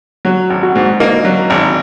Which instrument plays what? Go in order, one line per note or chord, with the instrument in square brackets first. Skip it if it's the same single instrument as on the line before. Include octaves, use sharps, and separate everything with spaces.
[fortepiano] F#3 [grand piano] F#4
[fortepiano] G#1
[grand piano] F#4
[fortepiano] G#2
[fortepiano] A#3 [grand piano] D#4
[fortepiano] F#3
G#1